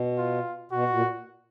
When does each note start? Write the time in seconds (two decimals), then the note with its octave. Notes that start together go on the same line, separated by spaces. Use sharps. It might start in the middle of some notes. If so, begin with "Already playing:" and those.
Already playing: B2
0.18 F4
0.72 B2 F#4
0.90 A#2